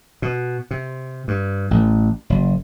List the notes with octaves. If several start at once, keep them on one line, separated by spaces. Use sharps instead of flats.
B2
C3
G2
A1
F#1